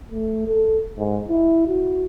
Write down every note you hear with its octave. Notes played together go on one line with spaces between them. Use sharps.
A3
A4
G#2
E4
F#4